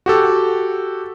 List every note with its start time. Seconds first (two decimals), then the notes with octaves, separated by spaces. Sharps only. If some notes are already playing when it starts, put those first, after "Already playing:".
0.06 F#4 G4 A4